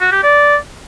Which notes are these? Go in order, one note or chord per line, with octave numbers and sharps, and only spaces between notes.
F#4
G4
D5